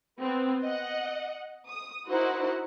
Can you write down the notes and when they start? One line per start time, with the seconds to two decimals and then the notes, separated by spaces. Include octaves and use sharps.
0.21 B3 C4
0.63 D#5 F#5
1.69 D#6
2.08 D#4 E4 F#4 A#4 C5 F#5